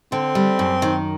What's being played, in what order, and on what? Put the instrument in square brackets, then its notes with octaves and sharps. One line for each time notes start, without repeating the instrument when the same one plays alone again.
[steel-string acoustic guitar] D3 [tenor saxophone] C4
[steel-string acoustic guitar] G3
F#2
D#3